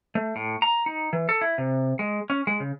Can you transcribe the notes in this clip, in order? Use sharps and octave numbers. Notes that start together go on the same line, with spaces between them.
A3
A2
A#5
D#4
E3
A4
E4
C3
G#3
C#4
G#3
C#3